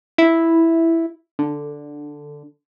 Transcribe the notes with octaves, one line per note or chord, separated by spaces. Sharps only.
E4
D3